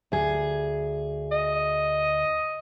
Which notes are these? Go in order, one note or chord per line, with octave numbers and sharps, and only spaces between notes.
D2 G#4
D#5